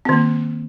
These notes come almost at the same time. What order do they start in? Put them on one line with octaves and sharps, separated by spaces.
C4 D#3 A#3